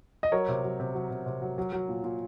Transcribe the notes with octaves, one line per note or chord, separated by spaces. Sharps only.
D#5
F#3 A#4 C#5
C3
F#3
C3
F#3
C3
C3
F#3
F#3
F#3
A#2
A#2